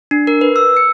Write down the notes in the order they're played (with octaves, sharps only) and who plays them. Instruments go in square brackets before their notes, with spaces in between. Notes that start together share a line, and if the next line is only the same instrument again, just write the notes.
[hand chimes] D4
A#4
B4
E6
C#7